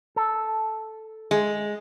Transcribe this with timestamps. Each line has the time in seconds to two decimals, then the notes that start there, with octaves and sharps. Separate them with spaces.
0.16 A4
1.31 G#3